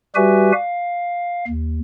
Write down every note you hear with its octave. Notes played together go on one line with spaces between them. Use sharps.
G3 F#4 G4 B4 E5 G#5
F5
D#2